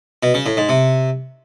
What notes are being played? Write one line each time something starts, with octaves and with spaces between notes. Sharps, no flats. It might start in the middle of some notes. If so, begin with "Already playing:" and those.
B2
C#3
A2
G#2
C3